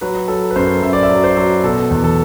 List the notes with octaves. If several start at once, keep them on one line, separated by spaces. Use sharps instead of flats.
F#3 B4
F#3 A4
B4
F#2 C5
F#2 E5
D5
E5
F#3
C5
F#3
B2 A4
E2
A4